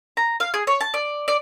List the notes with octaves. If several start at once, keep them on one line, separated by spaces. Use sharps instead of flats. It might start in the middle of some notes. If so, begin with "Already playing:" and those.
A#5
F5
G#4
C#5
A5
D5
D5